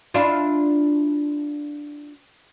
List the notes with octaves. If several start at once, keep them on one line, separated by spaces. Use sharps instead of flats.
D4 E4 F4